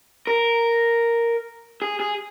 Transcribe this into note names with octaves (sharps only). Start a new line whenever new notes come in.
A#4
G#4
G#4